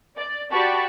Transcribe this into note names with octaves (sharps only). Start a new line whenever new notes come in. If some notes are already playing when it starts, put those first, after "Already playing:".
D5
F#4 G4 D5 A5 B5 C#6